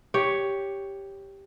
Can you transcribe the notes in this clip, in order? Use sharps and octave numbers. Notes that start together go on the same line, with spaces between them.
G4 C#5